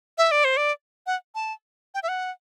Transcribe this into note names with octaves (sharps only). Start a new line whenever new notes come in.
E5
D5
C5
D5
F#5
A5
G5
E5
F#5